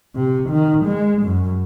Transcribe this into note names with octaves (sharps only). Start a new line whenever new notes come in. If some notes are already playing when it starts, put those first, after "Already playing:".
C3
D#3
G#3
F#2